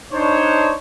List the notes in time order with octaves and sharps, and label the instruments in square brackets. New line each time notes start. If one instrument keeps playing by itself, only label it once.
[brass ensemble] D4 D#4 C5 C#5